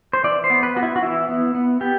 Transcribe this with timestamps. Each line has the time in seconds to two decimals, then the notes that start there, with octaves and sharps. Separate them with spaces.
0.13 C5
0.24 E3 D5
0.44 C5
0.50 B3
0.63 B4
0.76 B3 F#4
0.83 E4
0.96 F#4
1.02 E3 E4
1.29 B3
1.55 B3
1.81 B3 G4